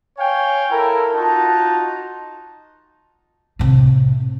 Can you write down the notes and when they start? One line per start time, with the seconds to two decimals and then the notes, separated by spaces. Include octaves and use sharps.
0.18 C#5 F5 G5 G#5
0.71 E4 A4 A#4
1.14 D#4 F4 F#4 A5
3.59 A2 C3